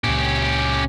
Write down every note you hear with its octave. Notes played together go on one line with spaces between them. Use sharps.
C#2 A#2 C#4 G4